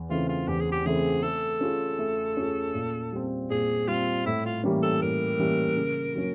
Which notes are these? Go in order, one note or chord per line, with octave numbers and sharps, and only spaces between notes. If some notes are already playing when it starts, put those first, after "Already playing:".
Already playing: E2
C#3 E3 A3 C4 F4
F4
E2 G4
G#4
G4
C#3 E3 A3 C4 G#4
A3 A4
C#4 F4 G#4
A3
C#4 F4 G#4
A#2
G3 C4
A#2 G#4
G3 C4 F4
A2 E4
F4
E3 G3 A#3 C#4
A4
A2 A#4
E3 G3 A#3 C#4
C#3
F#3 A#3 C#4